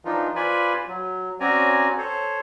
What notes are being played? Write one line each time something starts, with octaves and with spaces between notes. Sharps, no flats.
E3 F3 D4 D#4 F4
F4 B4 C5 D5 G#5 B5
F#3
C4 C#4 F#4 D5 G#5 A#5
A4 C5 C#5